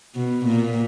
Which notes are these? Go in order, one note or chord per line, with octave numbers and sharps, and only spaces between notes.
B2
A#2